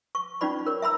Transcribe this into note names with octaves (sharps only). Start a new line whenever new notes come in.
C#6
C#4 D#4 F4 D5 B5
A#4 C#5
E5 A#5 B5 E6